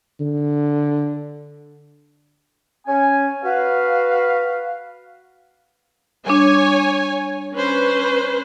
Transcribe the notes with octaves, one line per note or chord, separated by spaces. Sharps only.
D3
C#4 G#5
F#4 B4 F5
G3 D4 C#5 G#5
C#4 B4 C5